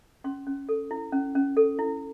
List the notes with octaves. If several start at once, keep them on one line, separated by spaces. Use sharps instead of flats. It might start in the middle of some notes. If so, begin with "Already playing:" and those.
C#4 C6
C#4
A4
E4
C#4
C#4
A4
E4